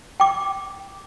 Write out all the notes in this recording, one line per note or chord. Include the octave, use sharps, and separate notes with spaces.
G5 D6